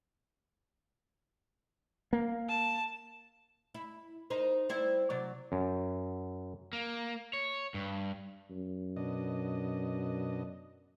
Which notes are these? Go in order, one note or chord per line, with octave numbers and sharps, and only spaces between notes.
A#3
A5
E4
D#4 A#4 C5
G3 C4 E4
C3 F#3 D5
F#2
A#3
C#5
G2
F#2
B2 D4 D#5